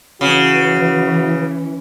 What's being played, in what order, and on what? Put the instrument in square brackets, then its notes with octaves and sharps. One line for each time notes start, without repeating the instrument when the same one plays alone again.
[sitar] C#3 [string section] E3 [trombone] F#4